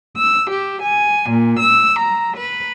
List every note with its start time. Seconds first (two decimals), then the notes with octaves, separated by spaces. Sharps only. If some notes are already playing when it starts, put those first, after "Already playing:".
0.17 E6
0.50 G4
0.82 G#5
1.29 A#2
1.59 E6
1.99 A#5
2.37 B4